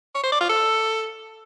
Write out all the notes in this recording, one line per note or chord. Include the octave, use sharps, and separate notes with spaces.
C#5
C5
D5
F4
A4